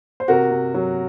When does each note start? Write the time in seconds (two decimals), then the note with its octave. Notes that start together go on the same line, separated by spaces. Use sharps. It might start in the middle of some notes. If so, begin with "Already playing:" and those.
0.20 C5
0.28 C3 F#4 A#4
0.51 C3
0.74 F#3